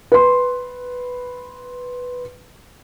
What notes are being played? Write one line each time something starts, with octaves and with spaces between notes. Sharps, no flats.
B4 C6